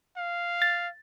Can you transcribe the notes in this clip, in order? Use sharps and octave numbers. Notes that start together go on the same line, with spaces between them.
F5
A6